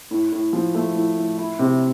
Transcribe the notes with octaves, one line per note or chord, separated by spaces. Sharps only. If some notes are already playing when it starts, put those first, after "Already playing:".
A2
A2
F3
A3
A2
A2
E4
C3